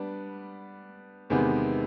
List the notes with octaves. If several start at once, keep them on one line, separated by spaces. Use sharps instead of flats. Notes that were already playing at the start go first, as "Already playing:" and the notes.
Already playing: G3 B3 D4
E2 C3 D#3 G#3 B3